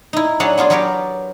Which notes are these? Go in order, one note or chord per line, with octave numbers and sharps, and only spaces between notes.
D#4 E4
F#3 D4 G#4 C#5 E5 F#5
B3 D4 F4 G#4
F#3 B3 G4 A#4 C#5 D5